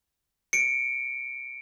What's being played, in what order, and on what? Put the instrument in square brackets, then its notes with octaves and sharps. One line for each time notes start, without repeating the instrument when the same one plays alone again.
[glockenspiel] C#7 D7